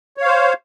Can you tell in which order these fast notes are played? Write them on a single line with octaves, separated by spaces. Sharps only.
C#5 F5 C5